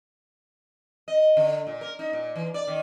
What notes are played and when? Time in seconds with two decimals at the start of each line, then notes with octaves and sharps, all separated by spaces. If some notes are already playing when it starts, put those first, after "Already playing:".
1.08 D#5
1.37 D3
1.67 A#2
1.81 A#4
1.99 D#4
2.13 A#2
2.36 E3
2.54 D5
2.68 D#3